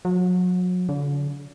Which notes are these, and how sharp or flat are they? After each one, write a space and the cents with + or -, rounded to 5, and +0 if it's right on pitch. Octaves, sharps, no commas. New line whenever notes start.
F#3 -35
D3 -45